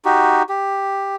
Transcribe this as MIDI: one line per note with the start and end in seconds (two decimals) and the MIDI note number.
0.05 0.43 63
0.05 0.43 66
0.05 0.43 67
0.49 1.16 67